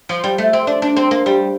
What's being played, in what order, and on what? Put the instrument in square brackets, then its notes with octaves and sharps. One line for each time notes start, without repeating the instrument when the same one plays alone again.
[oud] F3
G3
A3
C4
D4
D4
C4
A#3
G3